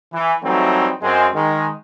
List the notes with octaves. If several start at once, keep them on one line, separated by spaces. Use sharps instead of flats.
E3
E3 F#3 G3 A3 C4 D#4
F#2 G#3 C4
D#3 G#3